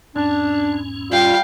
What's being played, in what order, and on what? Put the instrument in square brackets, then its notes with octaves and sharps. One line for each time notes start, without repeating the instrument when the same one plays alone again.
[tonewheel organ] E2 G#2 C#4 [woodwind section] D4
[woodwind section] G3 [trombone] F4 [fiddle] F5 G5